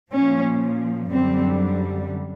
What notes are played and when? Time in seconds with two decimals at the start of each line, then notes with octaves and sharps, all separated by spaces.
0.11 A#2 F3 C#4
1.10 F#2 D3 G3 C4